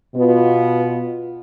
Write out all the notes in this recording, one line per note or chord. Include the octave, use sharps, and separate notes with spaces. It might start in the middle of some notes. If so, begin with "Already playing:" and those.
B2 B3 F4